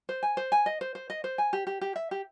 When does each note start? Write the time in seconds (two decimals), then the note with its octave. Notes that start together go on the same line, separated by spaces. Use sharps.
0.09 C5
0.23 G#5
0.37 C5
0.52 G#5
0.66 D#5
0.81 C5
0.95 C5
1.10 D#5
1.24 C5
1.38 G#5
1.53 G4
1.67 G4
1.81 G4
1.96 E5
2.11 G4